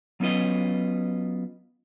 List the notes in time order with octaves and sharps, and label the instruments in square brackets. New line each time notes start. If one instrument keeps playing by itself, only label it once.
[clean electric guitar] F#3 B3 C#4 F4 B4 D#5